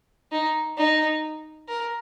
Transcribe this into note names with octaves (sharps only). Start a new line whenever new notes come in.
D#4
D#4
A#4